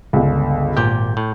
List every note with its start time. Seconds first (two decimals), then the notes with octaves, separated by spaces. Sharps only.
0.13 G1 C#2
0.77 G#1 A#2 G4 G6
1.17 A2